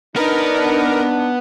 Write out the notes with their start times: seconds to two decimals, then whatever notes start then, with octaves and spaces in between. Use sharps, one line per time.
0.16 B3 D4 D#4 A#4 B4